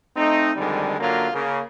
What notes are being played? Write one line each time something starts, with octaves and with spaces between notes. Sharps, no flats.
A3 C4 D#4
F2 D3 D#3 G3 G#3
F#2 D3 F#3 A#3 F4
C#3 A#3